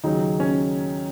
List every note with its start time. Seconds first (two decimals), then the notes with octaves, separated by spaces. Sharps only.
0.04 D#2 C#3 F#3 D#4
0.40 C#4